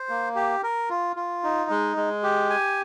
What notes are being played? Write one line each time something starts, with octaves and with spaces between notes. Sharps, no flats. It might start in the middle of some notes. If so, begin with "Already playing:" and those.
Already playing: C5
A#3
G4
A#4
F4
F4
D#4
G#3
G#3
G4
G#5